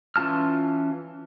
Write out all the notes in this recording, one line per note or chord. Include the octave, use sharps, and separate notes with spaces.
E3 C#4 F4 A5 F6